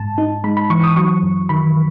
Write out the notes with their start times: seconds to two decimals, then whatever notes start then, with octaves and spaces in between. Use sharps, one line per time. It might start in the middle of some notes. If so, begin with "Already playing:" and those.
Already playing: G#2 A5
0.18 D#4
0.44 G#3 B5
0.57 B5
0.70 E3 C#6
0.84 D#6
0.96 F#3 C#6
1.23 F#2
1.49 D#3 B5